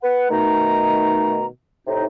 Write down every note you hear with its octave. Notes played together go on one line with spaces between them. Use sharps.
B4 F#5
B2 D#3 A3 D#4 A#5
A2 C3 D#4